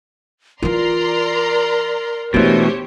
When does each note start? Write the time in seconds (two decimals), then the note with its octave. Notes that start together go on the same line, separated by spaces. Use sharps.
0.62 E3 F4 A#4 D5 A#5 C6
2.34 B2 E3 A3 D4 G4 C5 C#5